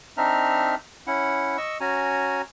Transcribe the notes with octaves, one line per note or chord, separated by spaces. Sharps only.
C4 D4 D#4 E5 A#5 F6
C#4 E4 F#5
D#5 C#6 E6
C#4 F#4 G#5 A#5